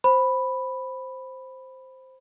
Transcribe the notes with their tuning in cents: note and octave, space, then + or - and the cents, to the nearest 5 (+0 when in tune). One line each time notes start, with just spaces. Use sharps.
C5 +0 B5 +0